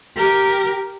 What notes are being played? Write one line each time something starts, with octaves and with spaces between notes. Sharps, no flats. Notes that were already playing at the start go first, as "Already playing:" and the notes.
G4 A#4